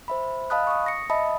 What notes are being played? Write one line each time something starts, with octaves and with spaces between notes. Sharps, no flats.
C5 E5 B5
D#5 F5 A5 B5 D#6 F#6
C#6 D#6
A#6 C#7
D#5 E5 A5 B5 D#6